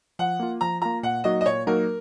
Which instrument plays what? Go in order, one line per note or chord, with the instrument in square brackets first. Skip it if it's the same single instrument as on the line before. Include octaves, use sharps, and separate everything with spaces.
[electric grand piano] F3 [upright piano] F#5
[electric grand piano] A#3 F4
[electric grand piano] F3 [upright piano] A#5
[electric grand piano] A#3 F4 [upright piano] A#5
[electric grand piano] A#2 [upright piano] F#5
[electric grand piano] F#3 A#3 D#4 F#4 [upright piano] D#5
[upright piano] D#5
[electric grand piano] A#2 [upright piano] C#5
[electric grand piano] F#3 A#3 D#4 F#4 [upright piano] A#4